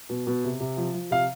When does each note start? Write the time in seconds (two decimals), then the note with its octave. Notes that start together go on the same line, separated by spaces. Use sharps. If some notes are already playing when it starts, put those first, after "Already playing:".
0.09 B2
0.27 B2
0.44 C3
0.60 C3
0.77 F3
0.94 F3
1.11 C3 F5